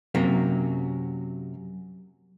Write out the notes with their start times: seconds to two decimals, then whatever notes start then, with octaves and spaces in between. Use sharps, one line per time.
0.15 F#2 C3 F#3 A#3